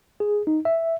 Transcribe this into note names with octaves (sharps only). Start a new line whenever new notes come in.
G#4
D#4
E5